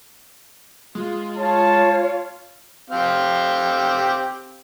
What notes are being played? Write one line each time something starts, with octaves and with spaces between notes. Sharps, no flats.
G#3 F4
F4 C#5 F5 A5
C4 G4 F5